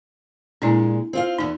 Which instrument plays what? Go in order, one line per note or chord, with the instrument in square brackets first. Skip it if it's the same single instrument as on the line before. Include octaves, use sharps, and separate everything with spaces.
[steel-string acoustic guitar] A#2 G#3 [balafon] D4 E4
[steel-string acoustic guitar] C4 F4 F5
[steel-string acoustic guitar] E2 B3 [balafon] D#4 C6